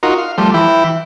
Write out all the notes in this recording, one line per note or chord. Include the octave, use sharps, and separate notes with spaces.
D#4 F4 F#4 A#4
F5
F3 G3 A3
E3 E4 G5